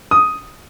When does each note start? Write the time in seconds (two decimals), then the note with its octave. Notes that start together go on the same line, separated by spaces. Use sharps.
0.11 D#6